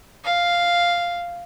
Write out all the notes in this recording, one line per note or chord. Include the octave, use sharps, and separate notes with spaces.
F5